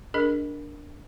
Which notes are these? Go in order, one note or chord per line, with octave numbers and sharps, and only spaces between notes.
D4 G#4 A#4 D#5